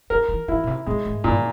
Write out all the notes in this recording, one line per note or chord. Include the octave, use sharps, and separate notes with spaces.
F3 A#4
E3
E3 E4
A#2
C3
A#2 G#3
G#2
G2 A#2